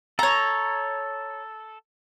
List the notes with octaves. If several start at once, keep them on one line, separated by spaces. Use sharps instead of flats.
A4 C#5 A#5